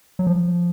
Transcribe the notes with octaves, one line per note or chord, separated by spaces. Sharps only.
F#3
F3